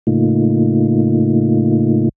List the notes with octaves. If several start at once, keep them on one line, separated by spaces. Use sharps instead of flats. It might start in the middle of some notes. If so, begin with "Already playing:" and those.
A2 C#3 A3 A#3 D#4 F4